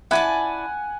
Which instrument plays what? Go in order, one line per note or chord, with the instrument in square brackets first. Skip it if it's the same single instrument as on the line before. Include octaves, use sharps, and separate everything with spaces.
[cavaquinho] E4 D5 A5 [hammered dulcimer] F#5 G#5